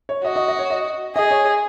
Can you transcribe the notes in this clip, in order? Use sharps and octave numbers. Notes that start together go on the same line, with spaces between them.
C#5
F#4 D#5
D#5
D#5
C#5
D#5
G#4 D#5
C#5